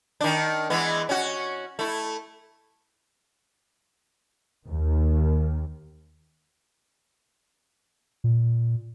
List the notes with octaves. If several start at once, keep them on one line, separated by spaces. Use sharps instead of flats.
D#3 D4
E3 G#3 B3
C#4 F#4
A3 E4
D#2 D#3
A#2